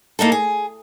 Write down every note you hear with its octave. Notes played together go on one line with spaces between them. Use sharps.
A#3 D#4 E4 A4
G#4